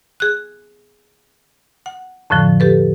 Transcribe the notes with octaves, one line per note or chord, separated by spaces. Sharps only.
G#4 F#6
F#5
F2 A2 D3 F3
G4 A4 B4